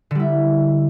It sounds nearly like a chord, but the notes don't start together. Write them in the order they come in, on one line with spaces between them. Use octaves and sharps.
D3 G3 E4